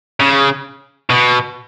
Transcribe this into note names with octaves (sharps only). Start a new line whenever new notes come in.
C#3
B2